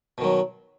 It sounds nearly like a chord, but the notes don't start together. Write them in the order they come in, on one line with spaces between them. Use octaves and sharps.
B2 D#3 F#3